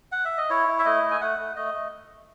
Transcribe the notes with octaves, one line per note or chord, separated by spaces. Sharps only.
F#5
E5
D#5
E4 C#5
E4
E5
A3 D#5
A3
G#5
A3 F#5
A3
A3 D#5
A3